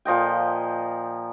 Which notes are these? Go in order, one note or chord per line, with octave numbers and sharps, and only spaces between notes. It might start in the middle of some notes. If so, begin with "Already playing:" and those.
A#2 F3 D#5 G5